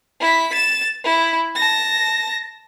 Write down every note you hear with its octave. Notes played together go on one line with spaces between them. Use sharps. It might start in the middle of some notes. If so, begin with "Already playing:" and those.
E4 B6
A6 E7
E4
A5 A#6